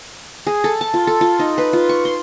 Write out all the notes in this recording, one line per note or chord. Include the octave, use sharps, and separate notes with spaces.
G#4
A4
A5
F4
A4
F4
D#4
B4
F4
C#6
C6